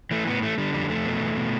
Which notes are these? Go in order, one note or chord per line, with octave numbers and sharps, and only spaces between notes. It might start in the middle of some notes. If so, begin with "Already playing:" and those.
E3 A3
A2 B3
E3 A3
D3 G3
F2 G3
F2 A3
B2
E2
B2